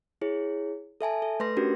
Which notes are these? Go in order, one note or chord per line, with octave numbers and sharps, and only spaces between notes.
E4 G#4 C#5
A4 E5 G#5 A5
A4
A3 B4 C6 A#6
C#4 D4 F#4 G4 A#4